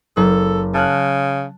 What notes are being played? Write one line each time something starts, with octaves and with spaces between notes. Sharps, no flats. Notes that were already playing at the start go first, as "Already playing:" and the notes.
F#1 A4
C#3 A5 F6 F#6